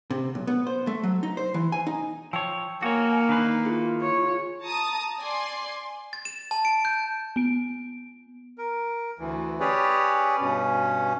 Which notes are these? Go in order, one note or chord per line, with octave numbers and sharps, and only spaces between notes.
C3
B1
B3
C5
A3
F#3
D#4
C5
E3
G#5
D#4
F3 C#5 G5 E6
A#3 F#4 C#5 G#5
D#3 D4 D#4 B4 C7
E4 F4 G#4
C#5
A5 A#5 D#6
D5 G#5 C6
A6
E7
A5
D7
G6
B3 D7
A#4
D2 E3
C#4 G4 G#4 B4 C#5 D5
G2 B2 C#4